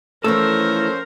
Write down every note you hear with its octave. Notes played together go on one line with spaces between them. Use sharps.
E3 F3 A3 C#4 A4 A#4 C5 E6